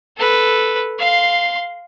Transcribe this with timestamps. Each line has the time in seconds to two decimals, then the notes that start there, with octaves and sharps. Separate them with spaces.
0.17 A4 B4
0.99 F5 C6